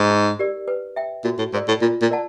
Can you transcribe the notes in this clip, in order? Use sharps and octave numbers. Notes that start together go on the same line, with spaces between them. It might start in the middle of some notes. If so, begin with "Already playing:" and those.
Already playing: G#2
D#4
G4 A#4 D5
B4
E5 G5
A#2 F#4
A2
G#2 A#4 D5
A2
A#2 F4
A#2
A#4 D5 F#5 A5